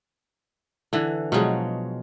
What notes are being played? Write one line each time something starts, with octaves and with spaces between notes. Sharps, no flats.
D3 E3
B2 F3 F#3 G#3